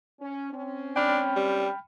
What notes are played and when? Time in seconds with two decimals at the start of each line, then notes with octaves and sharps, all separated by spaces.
0.19 C#4
0.52 C4 C#4
0.96 D4 G5 B5 F6
1.36 G3